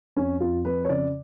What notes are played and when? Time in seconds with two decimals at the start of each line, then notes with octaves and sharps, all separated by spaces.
0.16 F2 C#4
0.40 F2 F4
0.65 F2 B4
0.85 C#5
0.89 C#3 D5